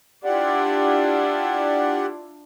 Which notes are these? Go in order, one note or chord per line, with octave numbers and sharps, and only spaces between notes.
D4 E4 F4 G4 D5 F#5